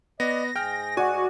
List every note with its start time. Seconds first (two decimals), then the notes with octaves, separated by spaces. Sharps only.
0.20 B3 D5 D#5 A#6
0.56 G#2 G#4 G5 F6
0.97 F#4 D5 F#5 G#5